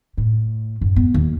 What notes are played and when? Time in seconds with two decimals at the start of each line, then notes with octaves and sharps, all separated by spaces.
0.17 A2
0.81 F#2
0.96 B3
1.14 D#2